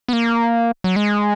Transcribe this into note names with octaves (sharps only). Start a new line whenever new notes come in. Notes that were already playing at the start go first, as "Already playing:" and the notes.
B3
A#3
F#3
G#3